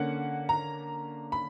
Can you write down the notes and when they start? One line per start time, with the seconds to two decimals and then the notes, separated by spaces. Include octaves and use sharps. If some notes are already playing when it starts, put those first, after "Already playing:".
Already playing: D3 A#3 C#4 F#5
0.49 A#5
1.32 B5